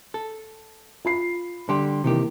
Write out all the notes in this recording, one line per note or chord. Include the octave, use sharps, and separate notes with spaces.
A4
F4 B5 C7
D3 G3 G4 C6
C3 D#3 E3 A#3 G4